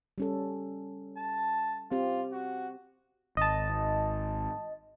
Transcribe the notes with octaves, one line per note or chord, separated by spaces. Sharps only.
G3 C#4 A4
A5
C4 F4 G4
F#4
G#1 D#5 A5